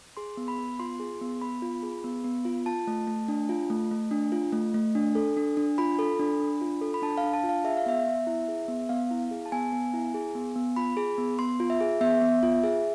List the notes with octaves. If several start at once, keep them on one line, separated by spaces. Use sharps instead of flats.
G#4 C6
B3
B5
B3
F4 C6
G#4
B3
B3 B5
F4
G#4
B3
B3
F4
F4 A5
A3
A3
D4
F4
A3
A3
D4
F4
A3
A3
D4
A4
D4
D4
F4 B5
A4
D4
D4
F4
A4
B5
D4 A5
F5
D4
A5
F4
F5
G#4 E5
F5
B3 E5
B3
E4
G#4
B3
B3 F5
E4
G#4
A5
B3 G#5
B3
E4
G#4
B3
B3
F4 B5
G#4
B3
B3 C6
F4
E5
G#4
B3 E5
B3
F4
G#4